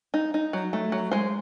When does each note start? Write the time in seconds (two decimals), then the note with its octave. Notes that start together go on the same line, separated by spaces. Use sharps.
0.14 D#4
0.34 D#4
0.53 F#3
0.73 A3
0.92 F#3
1.11 G#3 C5